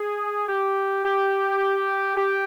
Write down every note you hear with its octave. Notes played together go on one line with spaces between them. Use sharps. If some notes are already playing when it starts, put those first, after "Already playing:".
Already playing: G#4
G4
G4
G4